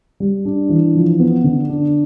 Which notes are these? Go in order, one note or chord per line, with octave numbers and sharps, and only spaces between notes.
G3
D4
E3
F3
B3
D3
D4